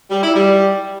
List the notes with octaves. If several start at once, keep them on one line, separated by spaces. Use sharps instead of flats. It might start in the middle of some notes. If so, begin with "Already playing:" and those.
G3
E4
G3